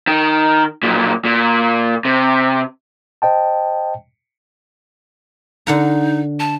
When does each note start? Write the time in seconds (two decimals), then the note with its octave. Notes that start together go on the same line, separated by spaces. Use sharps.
0.07 D#3
0.83 B1 A#2
1.25 A#2
2.05 C3
3.22 C5 D#5 G5 A5
5.67 D3 D#4 F#5 A#5
6.40 A5